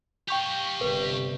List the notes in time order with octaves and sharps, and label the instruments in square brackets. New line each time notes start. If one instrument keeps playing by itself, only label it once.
[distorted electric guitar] G4 F5 [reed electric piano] G5 C#6 G6
[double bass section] G1 C3 [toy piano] B4